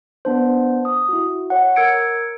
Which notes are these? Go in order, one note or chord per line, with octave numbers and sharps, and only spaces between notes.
B3 D4 C5
D#6
E4 F#4
C#5 F#5
A#4 E6 G#6 C#7 D7